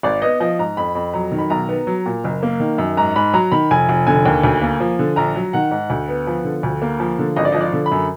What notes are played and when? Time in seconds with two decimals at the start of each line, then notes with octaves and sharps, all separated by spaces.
0.03 G#1 D5
0.22 B3 D#5
0.40 F3 D#5
0.59 G#2 A#5
0.77 F2 B5
0.95 F2
1.13 F#3 A#5
1.32 D#3
1.38 B5
1.50 B1 A#5
1.69 B3
1.87 F#3
2.06 A#2
2.24 F#1
2.43 A#3
2.60 D#3
2.78 F#2
2.97 G#2 A#5
3.16 G#2 B5
3.33 F#3 A#5
3.51 D#3 B5
3.71 F1 G#5
3.89 F1
4.07 D3 G#5
4.26 D#2
4.43 D2
4.62 A#3
4.80 F3
4.99 D3
5.16 A#1 A#5
5.35 F#3
5.53 D#3 F#5
5.71 G#2
5.90 D2
6.08 B3
6.27 F3
6.45 D3
6.63 D2
6.82 A#3
7.00 F3
7.19 D3
7.36 G#1 D#5
7.45 D5
7.52 F3 D#5
7.61 D5
7.73 D3
7.86 B5
7.91 F#2